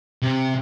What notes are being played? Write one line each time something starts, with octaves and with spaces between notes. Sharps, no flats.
C3